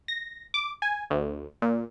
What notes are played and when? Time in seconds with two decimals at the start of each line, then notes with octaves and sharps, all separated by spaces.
0.08 A#6
0.54 D6
0.82 G#5
1.10 D2
1.62 A#2